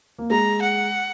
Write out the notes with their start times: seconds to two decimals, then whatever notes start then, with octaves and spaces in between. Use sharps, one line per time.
0.18 A#3
0.30 G#3 A#5
0.62 F#5